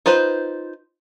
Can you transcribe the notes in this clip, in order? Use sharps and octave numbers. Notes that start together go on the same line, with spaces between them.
D#4 F4 B4 C5